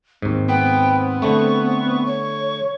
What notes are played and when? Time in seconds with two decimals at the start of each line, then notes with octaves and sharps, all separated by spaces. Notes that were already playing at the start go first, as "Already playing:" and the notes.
0.22 D#2 G#2 C4
0.49 B3 G5
1.22 D3 A3 C#6
2.06 C#5 C#6